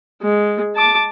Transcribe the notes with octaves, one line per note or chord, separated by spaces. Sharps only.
G#3
A5 D6